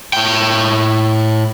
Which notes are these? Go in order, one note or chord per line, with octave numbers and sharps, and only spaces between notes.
A2 G5